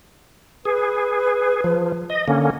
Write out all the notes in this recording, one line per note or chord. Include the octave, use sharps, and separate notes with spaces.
G#4 B4
F3
D#5
D3 A#3 C#4